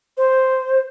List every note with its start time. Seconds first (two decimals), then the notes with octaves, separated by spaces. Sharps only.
0.17 C5